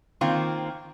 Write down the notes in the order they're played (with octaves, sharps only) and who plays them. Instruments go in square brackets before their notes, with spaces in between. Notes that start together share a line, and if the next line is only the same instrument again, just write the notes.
[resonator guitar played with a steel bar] D#3 A#3 C4 F4